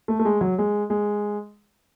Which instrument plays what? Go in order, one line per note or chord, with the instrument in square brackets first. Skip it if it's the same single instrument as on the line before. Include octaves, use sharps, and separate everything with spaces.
[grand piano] A3
A3
G#3
F#3
G#3
G#3